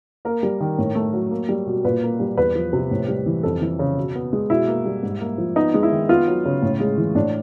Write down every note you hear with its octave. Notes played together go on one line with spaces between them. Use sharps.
A#3 A#4
G3
D#3
A2
A3
F#3
A#3
G3
B2
A#2 B4
A#3
G3
E2 B4
F3
C3
A2
G3
E3
F2 A4
E3
C#3
B2
B3
G#3
B2 E4
A#3
G3
G#2
A#3
F3
B3 D#4
G#3
E4
D#3
B3 F4
F#3
C#3
A2
G#3
E3
A2 D4